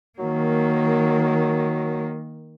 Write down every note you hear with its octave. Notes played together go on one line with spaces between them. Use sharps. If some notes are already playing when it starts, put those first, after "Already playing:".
D#3 F#3 A#3